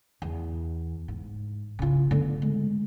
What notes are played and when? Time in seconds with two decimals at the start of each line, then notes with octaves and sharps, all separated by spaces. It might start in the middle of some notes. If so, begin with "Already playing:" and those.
0.22 E2
1.08 G#2
1.79 C#3 F4
2.11 D3 B3
2.42 G#3